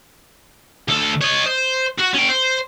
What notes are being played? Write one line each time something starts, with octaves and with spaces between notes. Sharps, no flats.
D2 A4
C#5 D#5
C5
F#4
C#4 G5
C5